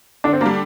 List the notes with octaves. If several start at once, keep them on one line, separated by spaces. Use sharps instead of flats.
D3 D4
C4
G3 A#3 D4